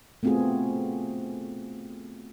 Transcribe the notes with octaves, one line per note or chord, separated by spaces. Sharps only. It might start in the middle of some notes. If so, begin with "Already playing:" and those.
A3 B3 C4 F4 F#4 G#4